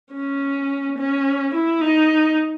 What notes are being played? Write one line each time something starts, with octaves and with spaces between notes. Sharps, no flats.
C#4
C#4
E4
D#4